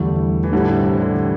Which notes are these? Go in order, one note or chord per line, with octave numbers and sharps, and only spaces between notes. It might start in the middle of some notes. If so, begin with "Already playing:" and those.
Already playing: E2 D3 G3 A3 E4
E3
A2 D3 G3 D4
C3
D3